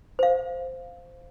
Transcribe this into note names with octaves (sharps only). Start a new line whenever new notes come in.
C5 F5